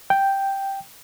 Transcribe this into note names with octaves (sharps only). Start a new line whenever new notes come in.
G5